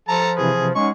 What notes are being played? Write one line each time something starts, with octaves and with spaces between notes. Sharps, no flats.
F3 A4 A5 A#5
C3 E3 G#4 B4
G#3 C#4 D#4 F#5 C#6